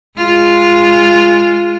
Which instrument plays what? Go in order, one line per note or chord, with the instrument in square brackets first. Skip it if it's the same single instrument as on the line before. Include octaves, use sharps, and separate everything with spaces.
[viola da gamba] G#3 F4